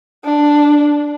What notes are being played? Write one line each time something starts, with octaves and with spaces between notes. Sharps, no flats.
D4